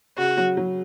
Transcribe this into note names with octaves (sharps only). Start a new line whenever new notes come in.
C#3 F#4
F#3
F#3